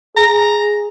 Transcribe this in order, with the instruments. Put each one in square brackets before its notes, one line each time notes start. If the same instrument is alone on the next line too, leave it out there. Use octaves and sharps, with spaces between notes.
[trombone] G#4 [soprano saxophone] A#5